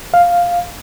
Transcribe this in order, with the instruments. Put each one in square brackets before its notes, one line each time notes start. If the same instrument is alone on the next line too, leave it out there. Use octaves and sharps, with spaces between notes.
[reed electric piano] F5